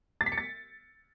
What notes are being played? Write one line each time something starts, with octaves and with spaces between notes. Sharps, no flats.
A6
B6
C#7
A6